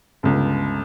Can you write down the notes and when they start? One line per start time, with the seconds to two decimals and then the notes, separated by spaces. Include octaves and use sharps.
0.23 G1 C#2